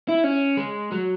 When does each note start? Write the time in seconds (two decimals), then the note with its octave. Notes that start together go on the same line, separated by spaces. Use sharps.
0.08 E4
0.24 C#4
0.57 G#3
0.92 F#3